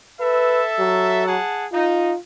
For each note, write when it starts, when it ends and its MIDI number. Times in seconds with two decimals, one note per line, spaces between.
0.20 1.25 69
0.20 0.62 71
0.20 1.25 76
0.79 1.37 54
1.26 1.66 68
1.26 1.66 78
1.26 1.66 81
1.72 2.13 63
1.72 2.15 65